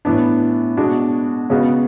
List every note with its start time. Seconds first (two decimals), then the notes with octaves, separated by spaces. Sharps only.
0.05 A2 E3 B3 D4
0.77 B2 G#3 D4 F#4
1.50 C#3 G#3 B3 F#4